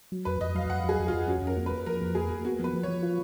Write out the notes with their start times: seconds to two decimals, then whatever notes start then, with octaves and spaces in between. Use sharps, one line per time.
0.12 F#3
0.25 F2 B4
0.41 F2 D#5
0.55 F#3 F5
0.70 F2 F#5
0.84 F#3 G#4
0.99 F2
1.08 F4
1.13 F2
1.28 C#4 F#4
1.42 F2 A#4
1.57 A#3
1.66 B4
1.71 A#3
1.86 F3 A#4
2.01 F2
2.15 A#3 G#4
2.30 A#3
2.45 B3 F#4
2.59 F3 B4
2.74 F3
2.83 C#5
2.88 F3
3.03 F4